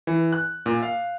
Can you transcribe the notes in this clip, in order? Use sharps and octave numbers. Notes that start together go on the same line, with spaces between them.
E3
F#6
A#2
F5